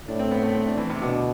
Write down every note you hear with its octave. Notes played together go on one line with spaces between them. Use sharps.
A2 D4
C4
B3
A3
C4
D4
E3
C3
B2 D3